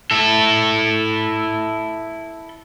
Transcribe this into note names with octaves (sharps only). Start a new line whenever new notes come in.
E4 A4